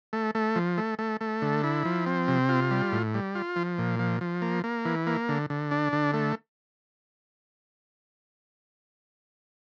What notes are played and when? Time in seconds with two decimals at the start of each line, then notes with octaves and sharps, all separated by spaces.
0.13 A3
0.35 A3
0.56 F3
0.78 A3
0.99 A3
1.21 A3
1.42 D3
1.64 E4
1.85 F3
2.06 C4
2.28 C3
2.49 F4
2.71 G3
2.92 A2
3.14 G3
3.35 F4
3.56 F3
3.78 A#2
3.99 F3
4.21 F3
4.42 A#3
4.64 A#3
4.85 E3
5.07 A#3
5.29 D3
5.50 D3
5.71 D4
5.93 D3
6.14 A3